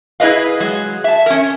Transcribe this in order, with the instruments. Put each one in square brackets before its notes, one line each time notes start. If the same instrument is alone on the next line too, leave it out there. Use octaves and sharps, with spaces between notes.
[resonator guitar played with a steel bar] E4 G#4 B4 D#5 F5
F#3 G#3 G#4
E5 A5
C#4 A#4